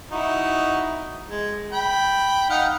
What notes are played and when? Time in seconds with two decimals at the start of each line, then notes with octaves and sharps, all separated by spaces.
0.11 D#4 E4 F#4
1.26 G#3
1.72 G5 B5
2.50 D#4 F5 F#5